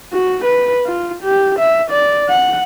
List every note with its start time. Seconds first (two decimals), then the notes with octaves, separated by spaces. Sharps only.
0.13 F#4
0.45 B4
0.86 F4
1.22 G4
1.59 E5
1.91 D5
2.29 F#5